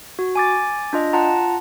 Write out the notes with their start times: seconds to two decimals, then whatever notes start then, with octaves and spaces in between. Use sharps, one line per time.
0.19 F#4
0.35 G#5 D6 A6
0.93 D4 F4 D#5
1.13 F4 F#5 A5 A#5